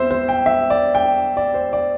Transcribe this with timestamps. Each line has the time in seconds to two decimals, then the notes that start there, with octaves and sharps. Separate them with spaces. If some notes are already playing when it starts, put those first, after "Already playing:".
Already playing: E2 C4 C5 E5
0.11 C5
0.29 G5
0.46 E5
0.70 D5
0.95 G5
1.37 D5
1.54 C5
1.73 D5